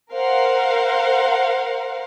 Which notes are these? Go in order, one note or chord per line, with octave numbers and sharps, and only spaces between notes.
A#4 C5 F5 F#5